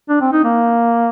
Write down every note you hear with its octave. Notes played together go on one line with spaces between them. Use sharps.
D4
C4
D#4
A#3